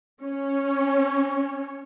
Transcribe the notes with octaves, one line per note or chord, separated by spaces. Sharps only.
C#4 C#5